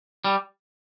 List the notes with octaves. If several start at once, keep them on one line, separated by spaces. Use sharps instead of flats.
G3